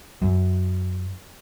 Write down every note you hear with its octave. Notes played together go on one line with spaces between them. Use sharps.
F#2